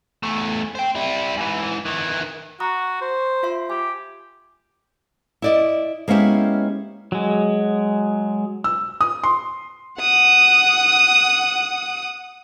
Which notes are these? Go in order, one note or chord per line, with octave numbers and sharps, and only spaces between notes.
E2 A3
C5 G5
G3 E4
G#2 E3
D#3 E3
F#4 A#5 C#6 D#6
C5
F4 E5 C6
G4 G#5
E4 D5 D#5
G#3 A#3 B3 C#4 E4 G4
F#3 G#3
E6
D#6
C6
F#5 D#6